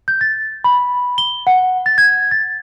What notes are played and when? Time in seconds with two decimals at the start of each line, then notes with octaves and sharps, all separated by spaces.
0.08 G6
0.21 A6
0.64 B5
1.18 G7
1.47 F#5
1.86 A6
1.98 G#6
2.31 A6